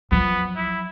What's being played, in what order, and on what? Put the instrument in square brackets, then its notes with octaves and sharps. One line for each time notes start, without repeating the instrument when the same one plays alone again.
[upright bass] F3 F#3 [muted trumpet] B3
[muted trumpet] E4